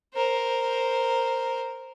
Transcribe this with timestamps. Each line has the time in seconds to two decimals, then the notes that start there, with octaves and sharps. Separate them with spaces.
0.14 A#4 C5